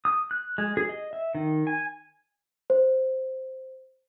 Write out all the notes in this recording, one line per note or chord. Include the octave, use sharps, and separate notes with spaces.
D#6
F#6
G#3
G#4
D#5
E5
D#3
G#5
C5